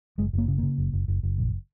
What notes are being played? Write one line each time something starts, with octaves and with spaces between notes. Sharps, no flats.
F#1 G#3
F#1 A#3
C#3
C#3 A#3
F#1
F#1
F#1
F#1
A#1